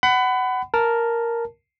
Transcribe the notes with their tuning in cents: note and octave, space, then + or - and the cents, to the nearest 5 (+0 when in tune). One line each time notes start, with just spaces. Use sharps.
F#5 +20 B5 +25
A#4 +0 A5 +0